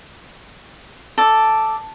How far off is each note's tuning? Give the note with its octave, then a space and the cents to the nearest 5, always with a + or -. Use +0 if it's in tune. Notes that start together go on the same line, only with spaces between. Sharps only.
A4 +0 D5 +0